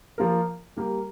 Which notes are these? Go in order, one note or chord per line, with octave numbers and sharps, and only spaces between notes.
F3 A#3 F4 A#4
G3 A#3 G4